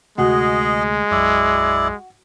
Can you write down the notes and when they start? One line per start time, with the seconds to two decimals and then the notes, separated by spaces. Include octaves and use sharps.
0.18 D2 C3 G#3 A3 F#4 G#4 D#5
1.11 B1 F#2 E4 D5